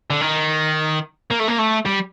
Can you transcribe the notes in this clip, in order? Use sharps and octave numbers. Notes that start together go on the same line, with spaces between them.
D3
D#3
A#3
A3
A#3
A3
G3